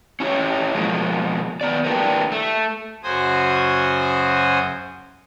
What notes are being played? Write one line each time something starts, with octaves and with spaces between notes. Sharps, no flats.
C#4 E4 G4 C#5
B2 F3 G#3 A#3
D#3 B3 D5
A#3 D4 E4 G4 A#4 B4
A3
F#2 C#3 F#4 C5 G#5 D#6